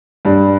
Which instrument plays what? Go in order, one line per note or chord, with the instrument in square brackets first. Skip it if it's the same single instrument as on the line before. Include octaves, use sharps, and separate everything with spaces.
[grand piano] G2 G3